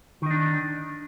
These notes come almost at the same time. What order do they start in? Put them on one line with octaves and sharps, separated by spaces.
D#3 D#4 D4